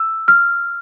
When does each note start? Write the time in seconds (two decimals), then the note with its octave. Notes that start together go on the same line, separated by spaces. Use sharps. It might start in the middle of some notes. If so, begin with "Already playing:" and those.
Already playing: E6
0.28 F6